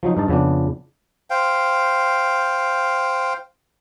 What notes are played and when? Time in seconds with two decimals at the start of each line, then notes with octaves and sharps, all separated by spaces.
0.03 F3 F#3 D#4
0.17 G2 D#4 A5
0.28 F2 C#3 B3 D4
1.30 C5 F5 G5